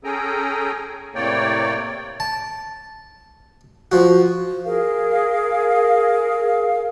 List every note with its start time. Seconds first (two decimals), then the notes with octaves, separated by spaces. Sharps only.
0.04 C#4 G#4 A4 G5 G#5 A#5
1.15 A2 C3 A#3 C#5 D5 G5
2.20 A5
3.92 F3 F#4
4.65 G#4 A#4 F5